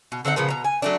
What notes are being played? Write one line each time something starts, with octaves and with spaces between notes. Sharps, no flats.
B2
D3 C4 D#4 F#5
A#2 C#3 F3 B3
B2 A#5
G#5
F#3 A3 D4